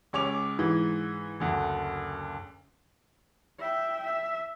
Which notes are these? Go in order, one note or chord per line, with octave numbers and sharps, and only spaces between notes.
C#2 C#4 D6 F7
G#2 E3
F#1 D2
E5 G5
E5